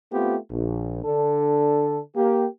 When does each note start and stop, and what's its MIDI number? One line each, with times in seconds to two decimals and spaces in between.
0.12 0.36 57
0.12 0.36 59
0.12 0.36 60
0.12 0.36 65
0.12 0.36 67
0.51 1.02 34
1.05 1.99 50
1.05 1.99 62
1.05 1.99 69
2.16 2.46 58
2.16 2.46 67